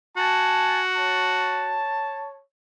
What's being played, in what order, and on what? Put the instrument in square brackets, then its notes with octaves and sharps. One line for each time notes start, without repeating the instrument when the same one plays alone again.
[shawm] F#4 [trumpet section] G#5 A5
[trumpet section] C#5 A5